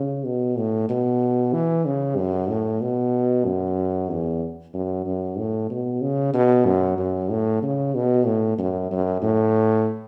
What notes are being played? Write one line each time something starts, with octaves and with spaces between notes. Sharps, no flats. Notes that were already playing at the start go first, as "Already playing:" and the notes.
Already playing: C#3
B2
A2
B2
E3
C#3
F#2
A2
B2
F#2
E2
F#2
F#2
A2
B2
C#3
B2
F#2
F#2
A2
C#3
B2
A2
F#2
F#2
A2